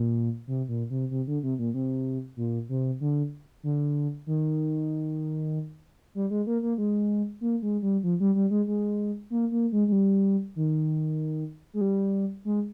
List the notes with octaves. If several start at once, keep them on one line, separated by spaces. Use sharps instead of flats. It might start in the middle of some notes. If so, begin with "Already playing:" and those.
Already playing: A#2
C3
A#2
C3
C3
D3
C3
A#2
C3
A#2
C3
D3
D3
D#3
G3
G#3
A#3
A#3
G#3
A#3
G#3
G3
F3
G3
G3
G#3
G#3
A#3
A#3
G#3
G#3
G3
D#3
G#3
G3
G#3